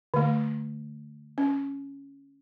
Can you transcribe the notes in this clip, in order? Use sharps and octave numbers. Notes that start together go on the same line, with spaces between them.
D3 A3
C#4